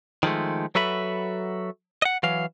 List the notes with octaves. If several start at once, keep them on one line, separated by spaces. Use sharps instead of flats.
D#3 F3 G#3 A3
F#3 F#4 A4 B4 E5 B5
D#5 F#5
E3 F#3 F5